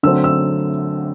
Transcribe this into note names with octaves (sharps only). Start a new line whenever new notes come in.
D3 F#3 A3 C4 E6
E6